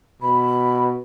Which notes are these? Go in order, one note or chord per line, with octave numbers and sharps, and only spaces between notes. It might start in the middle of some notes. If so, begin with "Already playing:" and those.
B2 B5